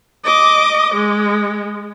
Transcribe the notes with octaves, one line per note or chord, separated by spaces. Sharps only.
D#5 D6
G#3